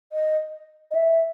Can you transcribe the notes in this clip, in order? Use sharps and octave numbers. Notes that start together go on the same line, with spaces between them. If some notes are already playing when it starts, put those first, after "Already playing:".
D#5
D#5
E5